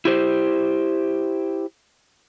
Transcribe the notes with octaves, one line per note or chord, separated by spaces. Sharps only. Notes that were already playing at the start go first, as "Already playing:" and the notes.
E4 G4 C5